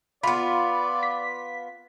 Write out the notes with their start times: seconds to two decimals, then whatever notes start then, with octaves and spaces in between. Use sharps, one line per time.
0.23 B3 F4 D5 B5
1.03 B6